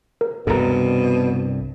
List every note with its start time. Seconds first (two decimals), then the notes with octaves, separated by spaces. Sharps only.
0.21 A#4
0.47 C2 G2 B2 A4 A#4 A#5